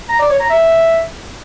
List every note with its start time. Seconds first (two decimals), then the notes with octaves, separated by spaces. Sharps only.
0.09 A#5
0.19 D5
0.30 C#5
0.40 A#5
0.50 E5